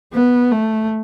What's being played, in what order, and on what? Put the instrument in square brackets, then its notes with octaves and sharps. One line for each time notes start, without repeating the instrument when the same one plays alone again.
[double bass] B3
A3